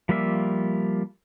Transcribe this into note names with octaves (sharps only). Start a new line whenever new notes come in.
F3 G3 A#3 F4 E5